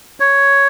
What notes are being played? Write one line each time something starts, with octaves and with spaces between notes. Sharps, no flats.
C#5